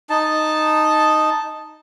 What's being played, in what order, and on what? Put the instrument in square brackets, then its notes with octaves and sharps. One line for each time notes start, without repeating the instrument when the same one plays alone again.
[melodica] D#4 A5